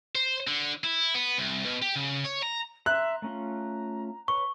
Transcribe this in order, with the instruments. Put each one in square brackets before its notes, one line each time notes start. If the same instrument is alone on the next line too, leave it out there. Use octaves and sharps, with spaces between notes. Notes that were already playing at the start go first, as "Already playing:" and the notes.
[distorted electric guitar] C5
D3
E4
B3
C2
B2
G4
C#3
C#5
A#5
[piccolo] E5 [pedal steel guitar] A#5 C6 [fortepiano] F#6
[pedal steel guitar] A3 C#4 F4 [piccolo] A#5
[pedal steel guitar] B4 C#5 [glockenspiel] C#6